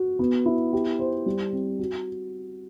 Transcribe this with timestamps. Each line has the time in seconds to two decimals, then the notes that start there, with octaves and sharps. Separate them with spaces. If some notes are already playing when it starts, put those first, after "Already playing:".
Already playing: F#4
0.19 B3
0.46 E4
0.73 G4
0.99 C5
1.26 G3
1.53 C4
1.79 F#4